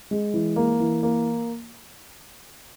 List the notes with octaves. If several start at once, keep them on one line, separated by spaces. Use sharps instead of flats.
G#3
E3
A#3
E3
A#3